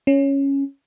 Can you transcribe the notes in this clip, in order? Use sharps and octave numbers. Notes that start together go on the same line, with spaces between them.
C#4